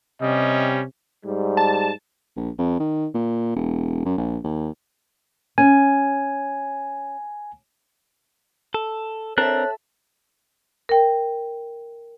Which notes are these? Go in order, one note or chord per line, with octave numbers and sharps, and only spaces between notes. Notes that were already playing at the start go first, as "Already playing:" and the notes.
C3 G3 C#4 D#5
G#2 G3
A5
A#1
F2
D#3
A#2
E1
F#2
A#1
D#2
C#4 G#5
A4
C4 D4 A4 A#4 C#5 E5 F#6
A#4 G5